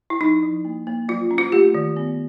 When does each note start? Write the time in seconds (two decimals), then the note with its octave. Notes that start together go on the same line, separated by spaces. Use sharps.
0.10 E4
0.21 F3 D#4
0.42 F3
0.65 A#3
0.87 A#3
1.09 F#3 F4
1.31 C#4
1.38 F4
1.52 A3 G4
1.74 D#3
1.97 B3